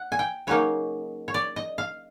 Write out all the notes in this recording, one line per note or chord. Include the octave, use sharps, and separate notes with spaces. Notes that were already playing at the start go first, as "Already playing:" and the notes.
Already playing: F#5
G#5
G5
C#3 F#3 A#3 D#4 C#5
C#5
D5
D#5
F5